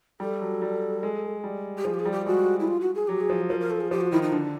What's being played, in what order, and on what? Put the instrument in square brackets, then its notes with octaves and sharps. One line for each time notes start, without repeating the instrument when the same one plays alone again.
[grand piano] G3 [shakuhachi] A4
[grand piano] F#3
G3
G#3
G3
[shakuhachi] G4
[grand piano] F3 [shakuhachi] G#4
[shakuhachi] G4
G#4
[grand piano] G3
[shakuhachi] G4
[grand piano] G#3 [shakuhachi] F#4
[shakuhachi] E4
F4
F#4
G#4
[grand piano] F#3 [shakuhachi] G4
[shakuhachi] G#4
[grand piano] F3
[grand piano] F3 [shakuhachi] A#4
[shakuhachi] A#4
A4
G#4
[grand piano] F3 [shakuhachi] G4
[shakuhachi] F#4
[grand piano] D#3 [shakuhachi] E4
[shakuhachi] D#4
[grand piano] D3 [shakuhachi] D4